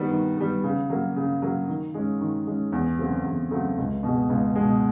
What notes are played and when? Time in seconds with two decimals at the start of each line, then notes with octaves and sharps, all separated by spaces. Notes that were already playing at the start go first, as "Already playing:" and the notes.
Already playing: D#3 G3 B3
0.11 D#3
0.37 G3 B3
0.64 C#3
0.90 F#3 A#3
1.16 C#3
1.42 F#3 A#3
1.68 D#3
1.94 G#3 C#4
2.21 D#3
2.47 G#3 C#4
2.72 E2
2.99 C#3 F#3 A3 C4
3.25 E2
3.51 C#3 F#3 A3 C4
3.78 C#2
4.03 B2 G#3
4.30 C#2
4.56 B2 G#3